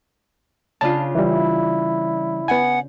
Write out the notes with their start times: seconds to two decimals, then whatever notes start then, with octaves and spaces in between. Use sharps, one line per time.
0.81 C#3 D4 F4 A5
1.15 E3 G3 E4
2.48 B3 F#5 G#5